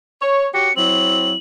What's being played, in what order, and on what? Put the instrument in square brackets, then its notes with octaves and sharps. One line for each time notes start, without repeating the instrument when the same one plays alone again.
[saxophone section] C#5
[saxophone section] F#4 G4 C#5 [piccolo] C#7
[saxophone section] F#3 C4 E4 [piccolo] F#7